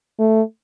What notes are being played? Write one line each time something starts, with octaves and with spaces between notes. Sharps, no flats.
A3